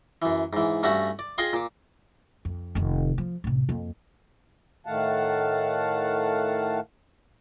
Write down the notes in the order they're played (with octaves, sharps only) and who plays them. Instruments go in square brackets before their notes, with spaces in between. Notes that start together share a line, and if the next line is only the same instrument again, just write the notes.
[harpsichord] F#2 E3
G#2 E3
G2 A3 C#4 F#4 F#5 A5
D5
F4 G#4 D#5 G5 G#5 C6
A#2 D6
[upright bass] F2
F1 D#3
F3
A1 C3
F2 A#3
[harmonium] A2 D#3 A3 F5 F#5 A5